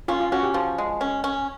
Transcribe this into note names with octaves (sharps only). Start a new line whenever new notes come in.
C#4 F4
F4
C#4 F#4
G4
F3
G#3
C#4
C#4